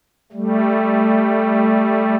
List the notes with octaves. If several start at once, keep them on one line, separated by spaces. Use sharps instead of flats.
G3 A3